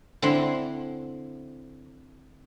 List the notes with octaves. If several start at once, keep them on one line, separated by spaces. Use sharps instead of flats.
D3 C4 E4 C6